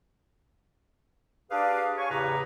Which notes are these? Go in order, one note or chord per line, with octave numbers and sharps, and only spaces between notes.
D4 G4 G#4 B4 D5 F5
C#5 G#5 C#6
E2 A2 C#3 G4 B4 A#5